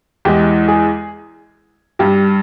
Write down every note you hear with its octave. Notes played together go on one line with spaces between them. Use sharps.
E2 E3 G#3 G4
G#4
G2 G3 G4